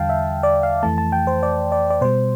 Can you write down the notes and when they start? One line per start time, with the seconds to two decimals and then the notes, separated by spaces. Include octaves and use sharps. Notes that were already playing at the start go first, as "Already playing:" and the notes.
Already playing: E2 D3 G3 F5 G5 A5
0.09 E5
0.43 D5
0.63 F5
0.83 F2 E3 A3 A5
0.98 A5
1.12 G5
1.27 C5
1.43 D5
1.72 D5
1.90 D5
2.01 B2 G3 C5